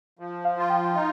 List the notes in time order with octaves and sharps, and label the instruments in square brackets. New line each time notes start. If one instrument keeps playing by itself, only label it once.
[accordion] F3
[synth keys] F5
[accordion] F4
[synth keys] G5
G5
[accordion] D#4 [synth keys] F5